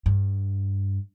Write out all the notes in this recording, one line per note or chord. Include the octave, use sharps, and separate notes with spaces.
G2